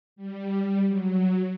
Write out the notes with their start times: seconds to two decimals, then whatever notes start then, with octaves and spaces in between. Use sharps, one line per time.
0.16 G3
0.88 F#3